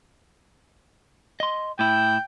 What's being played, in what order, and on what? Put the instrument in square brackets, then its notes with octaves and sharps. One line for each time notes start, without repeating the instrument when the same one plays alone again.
[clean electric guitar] D#5 C6
[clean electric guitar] A2 E4 [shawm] G5